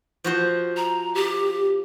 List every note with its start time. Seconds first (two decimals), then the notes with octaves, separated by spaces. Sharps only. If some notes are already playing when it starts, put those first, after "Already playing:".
0.24 F3 F#4 C5
0.77 A#5
1.15 G4